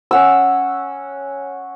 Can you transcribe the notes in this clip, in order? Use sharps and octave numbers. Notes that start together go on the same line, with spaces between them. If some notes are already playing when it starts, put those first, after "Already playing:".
C#4 F#5 E6